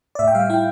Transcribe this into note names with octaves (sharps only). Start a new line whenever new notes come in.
D5
A2 E5
G5
G3 F5
E4 G5